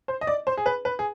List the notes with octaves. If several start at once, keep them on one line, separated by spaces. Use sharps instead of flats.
C5
D#5
D5
C5
G#4
B4
B4
G#4